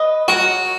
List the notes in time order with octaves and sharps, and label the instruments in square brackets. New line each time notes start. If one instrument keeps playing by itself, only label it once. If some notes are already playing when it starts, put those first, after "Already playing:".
Already playing: [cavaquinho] B4 D#5 D#6
[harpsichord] F#4 [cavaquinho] A#4 C#5 G#5 C#6